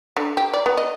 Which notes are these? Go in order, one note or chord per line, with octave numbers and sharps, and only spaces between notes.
D3
G4
D5
B3
D#5